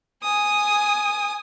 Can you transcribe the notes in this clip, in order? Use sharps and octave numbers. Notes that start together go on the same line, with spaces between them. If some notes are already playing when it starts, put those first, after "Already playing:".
G#5 D#6